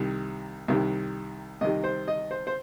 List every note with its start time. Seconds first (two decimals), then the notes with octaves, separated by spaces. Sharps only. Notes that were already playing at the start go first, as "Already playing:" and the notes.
Already playing: C2 C3 D#3
0.68 C2 C3 D#3
1.61 C2 C3 D#3 D#5
1.84 C5
2.08 D#5
2.31 C5
2.47 C5